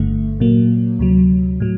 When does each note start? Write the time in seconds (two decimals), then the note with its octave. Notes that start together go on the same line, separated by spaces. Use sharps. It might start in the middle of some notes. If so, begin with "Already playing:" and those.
Already playing: G1 G2 D3 A3
0.40 A#2 F#3 A#3
0.99 D2 C3 F#3
1.60 A2 F#3